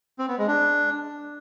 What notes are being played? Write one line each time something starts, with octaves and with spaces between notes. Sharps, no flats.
C4
B3
G#3
D4